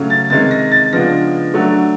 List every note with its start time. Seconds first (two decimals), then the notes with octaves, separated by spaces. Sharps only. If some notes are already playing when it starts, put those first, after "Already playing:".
Already playing: C#3 F#3 A3 C#4
0.10 A6
0.30 C3 D#3 G#3 C#4 A6
0.51 A#6
0.72 A6
0.93 C#3 F3 G#3 B3 D4 A#6
1.54 D3 F#3 A3 D4